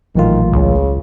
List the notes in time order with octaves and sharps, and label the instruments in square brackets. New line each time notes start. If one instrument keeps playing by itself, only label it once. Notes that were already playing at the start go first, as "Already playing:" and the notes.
[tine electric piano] A1 A3 F4 [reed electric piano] A#2 E3 F#3 [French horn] D#3
[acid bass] C#2 [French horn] C#3